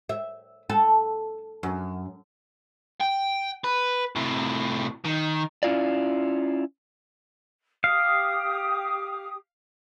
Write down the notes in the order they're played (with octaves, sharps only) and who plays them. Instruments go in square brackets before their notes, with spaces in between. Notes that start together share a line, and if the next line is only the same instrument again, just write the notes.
[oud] E5
A4
F#2
[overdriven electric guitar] G5
B4
A2 C3
D#3
[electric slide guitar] C#4 E4 F4 D5
[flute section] G4 D#6 [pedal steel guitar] F5